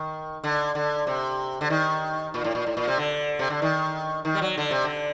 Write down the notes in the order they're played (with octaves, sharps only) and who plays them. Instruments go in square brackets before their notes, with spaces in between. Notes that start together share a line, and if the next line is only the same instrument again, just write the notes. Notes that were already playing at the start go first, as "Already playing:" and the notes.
Already playing: [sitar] D#3
D3
D3
C3
D3
D#3
A#2
A2
A#2
A2
A#2
C3
D3
C3
D3
D#3
D#3
G3
F#3
D3
C3
D3